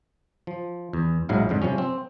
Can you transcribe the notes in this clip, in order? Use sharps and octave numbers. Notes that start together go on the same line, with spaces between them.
F3
E2
A#1 G#2 F#3 E4 F5
F2 G#2 D3
C3 F3 G3 C#4
C4